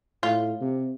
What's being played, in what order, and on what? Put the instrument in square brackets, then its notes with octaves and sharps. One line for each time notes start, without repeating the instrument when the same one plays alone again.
[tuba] A2 [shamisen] F4
[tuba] C3